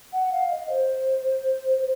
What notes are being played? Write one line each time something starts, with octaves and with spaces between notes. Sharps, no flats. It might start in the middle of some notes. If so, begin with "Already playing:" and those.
F#5
F5
D#5
C5
C5